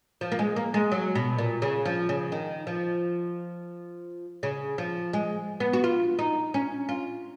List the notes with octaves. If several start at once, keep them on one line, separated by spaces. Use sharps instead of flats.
F3
A#3
G#3
A#3
G#3
F#3
B2
A#2
C#3
F3
C#3
D#3
F3
C#3
F3
G#3
B3
F#4
F4
D#4
C#4
F4